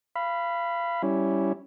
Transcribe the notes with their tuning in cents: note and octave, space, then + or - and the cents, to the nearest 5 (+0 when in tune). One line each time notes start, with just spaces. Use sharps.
F5 -30 B5 +0
G3 -10 C#4 +0 E4 +0